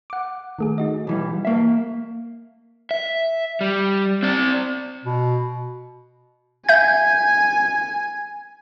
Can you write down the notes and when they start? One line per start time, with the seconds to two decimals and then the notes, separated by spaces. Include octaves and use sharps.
0.10 F#5 D6
0.59 D#3 A3 G#4
0.78 D#4 F#4 D#5
1.07 B1 E3 G3
1.45 A#3 E5
2.91 E5
3.61 G3
4.23 C4 D5
5.04 B2
6.69 E5 G#5 G6